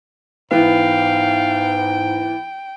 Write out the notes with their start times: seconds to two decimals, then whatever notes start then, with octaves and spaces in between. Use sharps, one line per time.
0.51 G#2 E3 B3 F5 G5